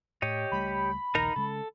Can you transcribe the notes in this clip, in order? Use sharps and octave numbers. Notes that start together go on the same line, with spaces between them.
A2 G4 C#5 D#5
C#2 G3 A3 B5
A#1 D#2 D#4 A#4 A#5
C#3 G#3 A4